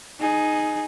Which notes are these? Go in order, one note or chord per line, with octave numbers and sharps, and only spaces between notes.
D#4 G#4